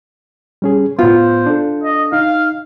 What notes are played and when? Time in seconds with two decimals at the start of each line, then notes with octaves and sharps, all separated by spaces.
0.62 G3 C#4 G#4
0.99 A2 B3 F4 C5
1.46 D4 A4
1.83 D#5
2.12 D#4 F5